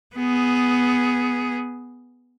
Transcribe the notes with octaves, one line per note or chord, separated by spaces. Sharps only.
B3 G#4